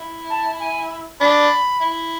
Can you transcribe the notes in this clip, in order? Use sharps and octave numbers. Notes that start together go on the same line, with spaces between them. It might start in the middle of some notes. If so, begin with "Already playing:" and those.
Already playing: E4
A5
G#5
D4 B5
E4